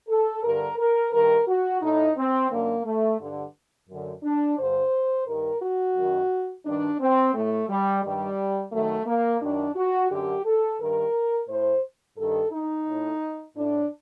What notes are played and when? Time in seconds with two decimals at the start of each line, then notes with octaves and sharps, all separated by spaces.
0.09 A4
0.43 G2 D3 A#4
0.78 A#4
1.13 G2 D#3 A#4
1.48 F#4
1.82 A2 D#4
2.17 C4
2.50 F#2 D3 A#3
2.85 A3
3.20 G2 D3
3.89 F#2 D3
4.23 D4
4.58 G2 D3 C5
5.27 G2 D#3 A#4
5.62 F#4
5.96 F#2 D#3
6.65 G2 D#3 D4
7.00 C4
7.34 A2 A3
7.69 G3
8.04 G2 D#3 G3
8.72 F#2 D#3 A3
9.07 A#3
9.41 F#2 D#3 D4
9.76 F#4
10.10 F#2 D3 G4
10.46 A4
10.80 G2 D#3 A#4
11.49 A2 C5
12.17 G2 D#3 A4
12.52 D#4
12.87 A2
13.56 A2 D4